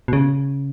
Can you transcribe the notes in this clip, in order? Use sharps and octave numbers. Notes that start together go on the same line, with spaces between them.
B2
C#3